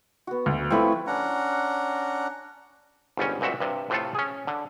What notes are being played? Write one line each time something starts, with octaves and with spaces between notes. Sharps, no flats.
B3 F#4
D2
F3 A3 C4 E4 B4 C#6
C#4 D4 F#5 A#5
G1 G#2 G3 C#4
C#2 A#2 C4 F#4 E5
G2 C3
A2 C3 A3 F4 A4
C#4 G#4
D3